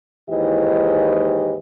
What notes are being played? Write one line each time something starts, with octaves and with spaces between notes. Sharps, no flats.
D#2 G#2 E3 E4 G4 D#5